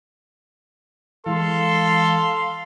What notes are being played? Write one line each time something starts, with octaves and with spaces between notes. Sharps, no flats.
E3 G#3 A4 F5 C6